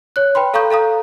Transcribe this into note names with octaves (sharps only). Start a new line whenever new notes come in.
C#5 F#6
B4 G5 B5 C6
A4 F5 A#5 C#6 D#6 G6
A4 F5 A#5 D#6